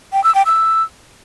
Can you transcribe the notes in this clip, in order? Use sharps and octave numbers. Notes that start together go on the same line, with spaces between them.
G5
E6
G5
E6